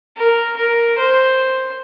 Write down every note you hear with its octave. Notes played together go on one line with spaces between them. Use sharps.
A#4
A#4
C5